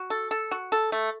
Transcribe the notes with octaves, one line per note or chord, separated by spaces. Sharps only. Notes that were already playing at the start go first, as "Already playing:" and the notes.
Already playing: F#4
A4
A4
F#4
A4
A3